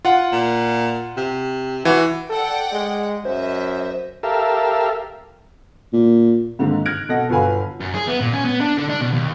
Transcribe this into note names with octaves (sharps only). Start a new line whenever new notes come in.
F4 F#5
A#2
C3
E3 F#4
A4 D5 F#5 G5
G#3
F#2 C5 D#5 E5
G4 A4 A#4 E5 F5
A#2
G#2 D3 D#3 A#3
F6 F#6 G#6 A#6 D7
B2 A4 D#5 F#5 A#6
G1 F#4 B4 F5 G#5 B5
F#2
G#4
B3
A#2
C#4
B3
D4
D3
D4
B2
D#2